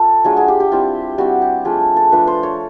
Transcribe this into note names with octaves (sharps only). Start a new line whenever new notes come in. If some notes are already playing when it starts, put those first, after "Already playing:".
Already playing: F4 A4
F#3 A3 D4 F4 G#4
G#4
G4
G4
G3 C4 E4 F4
G3 C4 E4 F#4
G4
F3 A3 D4 F4 G#4
A4
F3 A3 D4 F4 B4
C5
C#5